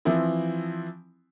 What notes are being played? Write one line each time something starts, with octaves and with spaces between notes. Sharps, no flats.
E3 F3 C4 E4